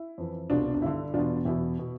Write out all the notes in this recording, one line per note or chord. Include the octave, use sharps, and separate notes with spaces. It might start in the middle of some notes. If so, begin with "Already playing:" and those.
Already playing: E4
F2 E3
C2 B2 D4 F4
D4
G2 D3 E4
E2 B2 D4 F4
E2 B2 E4
B2